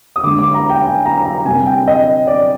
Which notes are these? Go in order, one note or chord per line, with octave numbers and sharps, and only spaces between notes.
D#6
D3 G#3 D6
D6
A#5
G5
G#5
A#5
A#5
C3 G3 A#3 G#5
G5
D#5
D5